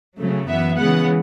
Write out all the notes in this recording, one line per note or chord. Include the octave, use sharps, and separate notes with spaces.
C#3 F#3 A3
F#2 E3 B3 E5
C#3 E3 G#3 B3 F#5